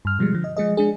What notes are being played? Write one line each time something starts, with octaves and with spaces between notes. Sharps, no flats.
G2 F6
B2 F3 G3 G#3
D3 F3
D#5
F3 G#3 G#4 D#5
G#3 D4 G#4